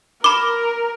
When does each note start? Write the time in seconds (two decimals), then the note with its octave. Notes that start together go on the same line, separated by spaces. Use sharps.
0.24 A#4 B5 D6